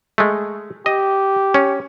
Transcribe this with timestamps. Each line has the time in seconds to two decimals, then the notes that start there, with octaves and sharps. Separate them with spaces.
0.18 G#3 A3
0.86 G4 D#5
1.54 C#4